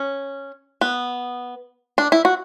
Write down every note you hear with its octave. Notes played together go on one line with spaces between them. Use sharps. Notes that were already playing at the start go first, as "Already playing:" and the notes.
Already playing: C#4
B3
D4
E4
F#4